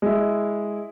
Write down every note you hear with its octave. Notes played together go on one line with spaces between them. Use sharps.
G#3 E4